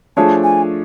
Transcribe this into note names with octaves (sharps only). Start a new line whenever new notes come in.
F3 A3 D4 G#4 C#5 A5
G#5